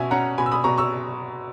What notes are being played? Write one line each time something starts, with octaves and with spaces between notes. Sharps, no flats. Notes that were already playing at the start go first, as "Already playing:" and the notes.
Already playing: B2 C#4 E5 G#5
C#4 F#5 A#5
B2 G#5 B5
E6
B5 D#6
B2 A#5 C#6
C#6 E6